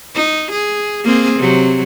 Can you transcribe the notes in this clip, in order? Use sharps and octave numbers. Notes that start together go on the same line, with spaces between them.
D#4
G#4
A#3 C4 G#4
C3 F#3